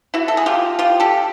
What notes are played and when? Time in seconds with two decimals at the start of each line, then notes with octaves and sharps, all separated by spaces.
0.14 E4 F#4
0.28 A4
0.37 G#4
0.46 F4 G4
0.79 F4 G4
1.00 G4 A4